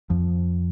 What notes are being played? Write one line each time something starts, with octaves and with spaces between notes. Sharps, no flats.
F2 F3